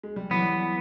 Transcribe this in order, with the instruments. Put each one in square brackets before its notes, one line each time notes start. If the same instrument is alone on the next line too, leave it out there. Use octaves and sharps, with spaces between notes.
[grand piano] G#3
G3
[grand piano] E3 F#3 [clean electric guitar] B3